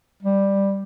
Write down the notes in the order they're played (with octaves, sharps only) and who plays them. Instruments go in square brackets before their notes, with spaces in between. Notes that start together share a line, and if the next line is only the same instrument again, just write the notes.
[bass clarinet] G3